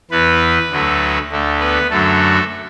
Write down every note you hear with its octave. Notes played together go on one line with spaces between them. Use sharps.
E2 E3 B3 B4
D2 D3 F#3 A3
D2 D3 A3
B3 B4
F#2 D3 F#3 A3 A4